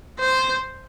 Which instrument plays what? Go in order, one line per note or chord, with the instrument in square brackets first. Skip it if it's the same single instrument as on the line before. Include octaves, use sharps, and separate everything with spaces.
[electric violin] C5